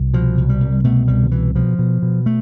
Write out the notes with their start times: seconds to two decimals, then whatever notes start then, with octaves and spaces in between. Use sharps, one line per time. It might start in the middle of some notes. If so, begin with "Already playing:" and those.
Already playing: C2
0.14 B2 F3
0.38 C2
0.49 G3
0.61 C2
0.84 B2 A3
1.08 C2 G3
1.23 D3
1.31 B2 E3
1.55 B2 F3
1.79 B2
2.02 B2
2.26 A3